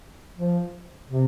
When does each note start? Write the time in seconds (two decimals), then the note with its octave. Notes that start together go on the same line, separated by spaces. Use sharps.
0.36 F3
1.09 C3